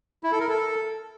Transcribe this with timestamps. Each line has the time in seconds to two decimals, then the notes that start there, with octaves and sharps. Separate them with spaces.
0.23 E4
0.32 A4
0.40 A#4
0.49 A4